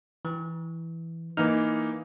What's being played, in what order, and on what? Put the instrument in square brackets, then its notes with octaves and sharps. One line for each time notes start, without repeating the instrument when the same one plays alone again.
[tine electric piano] E3
[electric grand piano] E3 A#3 D#4 [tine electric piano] F6